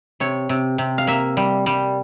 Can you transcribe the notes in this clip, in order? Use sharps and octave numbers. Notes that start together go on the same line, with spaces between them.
C3 C#5
C3
C3
F5
A#3 E5
G3
G3